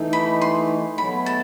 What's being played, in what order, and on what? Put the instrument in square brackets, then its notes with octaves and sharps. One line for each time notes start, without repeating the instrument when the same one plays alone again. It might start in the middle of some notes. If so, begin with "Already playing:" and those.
Already playing: [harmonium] E3 A3 D#4
[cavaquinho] B5
C6
[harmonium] B2 F#3 A3 [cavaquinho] B5
[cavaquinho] A5